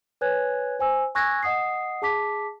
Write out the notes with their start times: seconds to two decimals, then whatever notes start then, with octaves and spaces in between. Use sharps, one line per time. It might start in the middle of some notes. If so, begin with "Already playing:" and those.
0.21 B4 C#5 G#5 F#6 G#6
0.79 C5 G#5 E6
1.15 G#5 C#6 E6 F#6 G#6 A#6
1.43 D#5 F#5 D#6 C7
2.02 G#4 A5 D6 B6